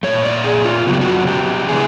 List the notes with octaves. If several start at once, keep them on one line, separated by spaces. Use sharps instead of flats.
A#2 F3 A3 C#5
D5
G#4
F4
C#3 F#3 B3 F#4
G4
F#4
G4
E3 G#3 B3 D4 G#4